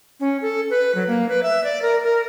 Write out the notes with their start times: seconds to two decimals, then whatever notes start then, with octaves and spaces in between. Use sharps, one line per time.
0.20 C#4
0.42 A4
0.70 B4
0.95 F#3
1.08 A#3
1.29 B4
1.43 E5
1.64 D5
1.82 A#4
2.03 A#4